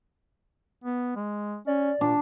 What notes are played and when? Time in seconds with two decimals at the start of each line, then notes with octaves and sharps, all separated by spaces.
0.84 B3
1.16 G#3
1.67 C#4 D5
2.01 A#2 D4